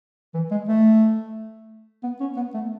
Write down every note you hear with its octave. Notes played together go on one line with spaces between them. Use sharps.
E3
G#3
A3
B3
C#4
B3
A3